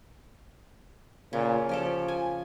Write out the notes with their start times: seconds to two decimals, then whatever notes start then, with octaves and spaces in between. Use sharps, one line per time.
1.33 A#2 C#3
1.69 F3 C#4 G4 A4
2.08 G#5